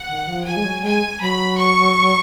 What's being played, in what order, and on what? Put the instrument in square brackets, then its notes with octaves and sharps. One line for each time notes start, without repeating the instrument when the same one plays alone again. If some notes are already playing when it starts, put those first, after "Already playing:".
Already playing: [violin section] F#5
[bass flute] D#3
F3
[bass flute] F3 [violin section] G#5
[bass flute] G#3
F#3
[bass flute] G#3 [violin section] G#5
[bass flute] F#3 [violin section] B5
[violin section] C#6